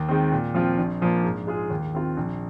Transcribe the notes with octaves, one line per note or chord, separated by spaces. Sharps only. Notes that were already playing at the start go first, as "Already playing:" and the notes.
Already playing: D#2
D#3 G#3 C4
A#2
F3 C4 F4
A#1
A#2 F3 A#3
G#2
G#3 F4 G#4
D#2
D#3 C4 F4
A#1